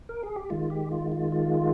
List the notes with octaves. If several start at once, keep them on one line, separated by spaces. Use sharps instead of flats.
A#4
G#4
G4
D#3 G#3 F4
G4
F4
F4
F4